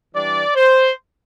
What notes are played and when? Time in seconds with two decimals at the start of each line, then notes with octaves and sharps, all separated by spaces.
0.14 E3 G3 D4 D5
0.55 C5